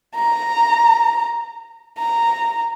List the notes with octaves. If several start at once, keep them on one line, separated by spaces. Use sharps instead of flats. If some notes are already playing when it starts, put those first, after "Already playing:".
A#5
A#5